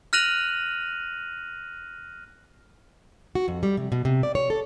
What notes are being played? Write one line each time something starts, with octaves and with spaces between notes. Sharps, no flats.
F6 F#6 A#6 D#7 F7 F#7
F#4
F2
G3
C3
B2
C3
D5
C#5
A4